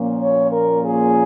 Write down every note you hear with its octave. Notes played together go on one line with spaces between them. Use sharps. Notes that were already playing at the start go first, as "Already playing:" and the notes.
Already playing: A#2 F3 A#3 C#4
C#5
A#4
G#4